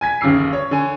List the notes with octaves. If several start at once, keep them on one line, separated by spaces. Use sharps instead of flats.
G#5 G#6 B6
G1 D#2 C#3 D6 E6 C7
C#5
D3 C#5 G#5